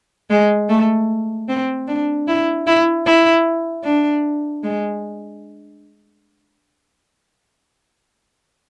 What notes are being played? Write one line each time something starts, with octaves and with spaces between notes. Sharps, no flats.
G#3
A3
C4
D4
E4
E4
E4
D4
G#3